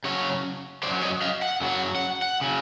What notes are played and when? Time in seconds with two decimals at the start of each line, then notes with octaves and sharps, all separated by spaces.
0.04 F#2 C#3 F#3 C#5
0.83 C#3 F#3 C5 D5
0.87 F#2
1.02 C#5 D#5
1.22 D#5 F5
1.42 F#5
1.61 F#2 C#3 F#3
1.68 F#5
1.95 F#5
2.22 F#5
2.41 C#3 F#3